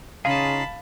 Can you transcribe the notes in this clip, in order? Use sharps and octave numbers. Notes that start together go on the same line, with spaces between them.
C#3 D#4 F4 G#4 F5 A5 B5